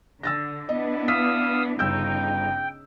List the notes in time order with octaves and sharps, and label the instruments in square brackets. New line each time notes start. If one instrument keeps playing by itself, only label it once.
[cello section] D3 [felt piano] E6 A6 A#6
[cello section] B3 D4 E4 [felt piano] D#5
[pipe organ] F5 D#6 E6 [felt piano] B6
[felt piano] G1 E6 G6 [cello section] C#3 D#4 [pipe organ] G5